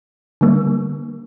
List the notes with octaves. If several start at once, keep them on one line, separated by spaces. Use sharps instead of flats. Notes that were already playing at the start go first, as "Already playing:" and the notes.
D3 G3 A#3